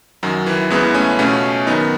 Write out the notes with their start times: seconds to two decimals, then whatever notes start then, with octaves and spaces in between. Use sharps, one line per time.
0.23 F#2 D#3 F#3
0.46 E3
0.70 E2 C#3 E3 G#3 B3
0.94 A3 C#4
1.19 C#2 B2 A3 C#4
1.67 F#2 D#3 B3 D#4